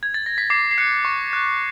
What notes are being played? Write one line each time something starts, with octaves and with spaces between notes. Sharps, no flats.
G#6
A6
A#6
B6
D6 C7
C7
F#6 C#7
C#6
F#6